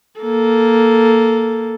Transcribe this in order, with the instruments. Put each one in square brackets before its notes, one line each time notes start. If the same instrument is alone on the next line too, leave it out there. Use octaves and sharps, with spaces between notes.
[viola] A#3 A4